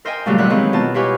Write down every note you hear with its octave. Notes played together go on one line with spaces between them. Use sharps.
A#4 C5 D#5 E5 G5 G#5
A#2 C#3 F#3 G3 A3
C3 D#3 G3 E5 F#5 F#6
D#3 E3 F#3 G#3 C4
B2 F4 A5
E4 F4 G4 B4 C#5 G#5